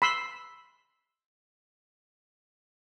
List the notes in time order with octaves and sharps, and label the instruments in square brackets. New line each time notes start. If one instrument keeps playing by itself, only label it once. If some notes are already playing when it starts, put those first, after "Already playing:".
[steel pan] B5 C6 E6